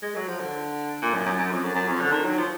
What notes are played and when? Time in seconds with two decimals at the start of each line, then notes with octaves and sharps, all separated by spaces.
0.02 G#3
0.15 F#3
0.28 F3
0.40 D3
1.02 A#2
1.14 F#2
1.26 F#2
1.39 F#2
1.51 F2
1.63 F#2
1.75 F#2
1.88 F2
2.00 D3
2.12 D#3
2.25 F#3
2.37 F3